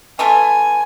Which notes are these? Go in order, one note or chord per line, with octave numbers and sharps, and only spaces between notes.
E3 A3 F4 G#5